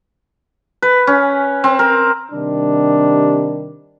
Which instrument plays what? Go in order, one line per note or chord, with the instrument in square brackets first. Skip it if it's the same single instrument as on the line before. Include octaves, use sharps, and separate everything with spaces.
[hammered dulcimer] B4
C#4
C4
A#4
[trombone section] C3 D#3 G3 D4